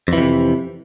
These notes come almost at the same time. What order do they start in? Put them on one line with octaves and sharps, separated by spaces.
F2 E3 C3